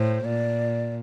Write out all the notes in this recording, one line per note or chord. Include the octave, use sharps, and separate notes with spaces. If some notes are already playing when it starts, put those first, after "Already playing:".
Already playing: A2 C5
A#2 D5